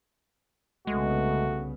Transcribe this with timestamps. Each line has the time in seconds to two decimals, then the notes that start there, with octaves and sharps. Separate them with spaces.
0.87 C2 C#3 G#3 A3 B3 F#4